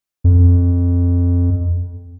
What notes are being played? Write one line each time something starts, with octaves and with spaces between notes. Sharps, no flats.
F2